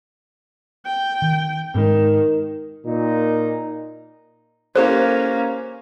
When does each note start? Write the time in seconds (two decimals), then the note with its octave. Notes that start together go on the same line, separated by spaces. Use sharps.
0.86 G5
1.22 D#3
1.75 G#2 D#3 G#3 C#4
2.86 A#2 D#4
4.76 A#3 C#4 E4 G4 A4 C5